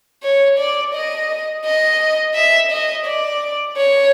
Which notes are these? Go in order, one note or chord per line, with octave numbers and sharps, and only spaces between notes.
C#5
D5
D#5
D#5
E5
D#5
D5
C#5